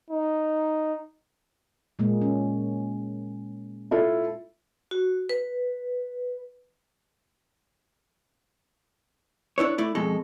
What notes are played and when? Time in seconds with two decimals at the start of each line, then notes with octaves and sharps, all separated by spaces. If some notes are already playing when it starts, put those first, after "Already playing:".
0.10 D#4
1.99 A#2 G#3 A#3
2.22 C#4
3.91 E4 F4 A4
4.91 F#4
5.29 B4
9.58 D4 E4 B4 C#5
9.78 A3 E4 D5
9.95 F2 B2 G#3 A4